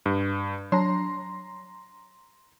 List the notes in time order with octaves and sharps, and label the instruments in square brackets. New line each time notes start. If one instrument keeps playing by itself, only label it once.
[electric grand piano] G2
[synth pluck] F#3 D4 [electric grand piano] A#5 C6